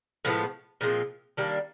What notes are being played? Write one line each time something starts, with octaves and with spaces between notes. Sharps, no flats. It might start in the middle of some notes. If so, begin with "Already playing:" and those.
A2 F3 G#3 B3
A#2 F3 G#3 C4
D#3 G3 A#3 D4